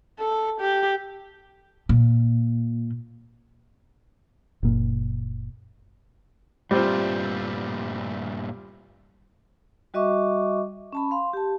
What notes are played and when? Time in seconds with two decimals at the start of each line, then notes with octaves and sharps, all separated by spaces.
0.19 A4
0.61 G4
1.89 A#2
4.63 F#1 A#2
6.71 G2 A#2 G3 A3 C4 F4
9.94 G3 F#4 D#5 E5 C#6 D6
10.93 C#4 A5 B5
11.11 F5 C6
11.33 G4 A5